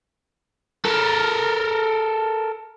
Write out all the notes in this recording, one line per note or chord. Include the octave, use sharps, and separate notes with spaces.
A4 A#4